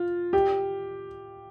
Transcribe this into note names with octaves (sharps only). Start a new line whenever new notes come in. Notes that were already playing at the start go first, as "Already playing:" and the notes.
Already playing: F4
G4